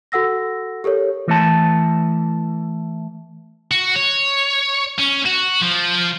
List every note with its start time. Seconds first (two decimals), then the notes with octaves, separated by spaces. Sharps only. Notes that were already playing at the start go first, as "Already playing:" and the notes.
0.12 F#4 A4 F#5 E6 A#6
0.84 G4 A4 A#4 C#5
1.28 E3 A3 A5
3.71 F#4
3.96 C#5
4.99 C#4
5.25 F#4
5.62 F3